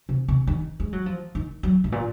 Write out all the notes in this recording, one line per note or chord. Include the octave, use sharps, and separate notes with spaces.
C3
C3
D#3
G#3
F#3
F3
D#3
F#3
G#2
A#2